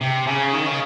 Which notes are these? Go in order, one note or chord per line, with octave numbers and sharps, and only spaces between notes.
C3
C#3
D#3
C#3